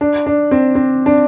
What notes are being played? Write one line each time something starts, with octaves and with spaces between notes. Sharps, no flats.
D4
D4
C4
C4
D4